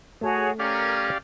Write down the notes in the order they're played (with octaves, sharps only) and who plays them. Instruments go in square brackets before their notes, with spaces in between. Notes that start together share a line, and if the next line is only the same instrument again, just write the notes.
[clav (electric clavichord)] A3 A5 [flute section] F#4 G#4 C#5
[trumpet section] C#4 [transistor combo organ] G4 D5 F5 [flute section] A#4